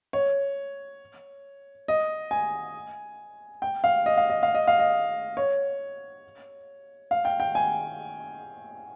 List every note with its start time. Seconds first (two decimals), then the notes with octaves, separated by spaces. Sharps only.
0.13 C#5
1.88 D#5
2.31 G#5
3.62 G5
3.84 F5
4.06 D#5
4.17 F5
4.30 D#5
4.43 F5
4.55 D#5
4.67 F5
4.79 D#5
5.37 C#5
7.11 F5
7.25 G5
7.40 G5
7.55 G#5